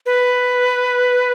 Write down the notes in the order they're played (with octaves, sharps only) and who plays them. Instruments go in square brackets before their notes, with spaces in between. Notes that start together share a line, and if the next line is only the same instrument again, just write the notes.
[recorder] B4